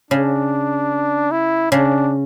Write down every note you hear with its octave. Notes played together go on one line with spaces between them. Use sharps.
C#3 D4
E4
C#3 D4